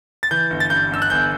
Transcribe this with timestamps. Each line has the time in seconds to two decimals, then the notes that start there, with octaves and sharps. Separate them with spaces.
0.23 A6
0.31 E3 G6
0.50 G1
0.60 A6
0.70 G2 G6
0.91 G2 E6
1.02 F#6
1.10 G1 G6